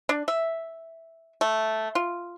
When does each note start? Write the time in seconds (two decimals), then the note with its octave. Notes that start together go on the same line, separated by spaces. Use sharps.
0.09 D4
0.28 E5
1.41 A3
1.95 F4